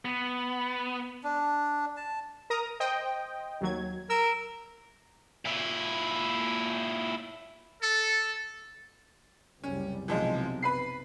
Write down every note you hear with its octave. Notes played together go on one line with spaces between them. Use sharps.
B3
D4
A5
A#4 A#5 D#6
C5 D#5 G5
D#2 F#3 G#6
A#4 E6
A#2 E4
A4
F#1 C2 G3 C#4
B1 F#2 C3 E3 F3 G#3
B4 B5 C7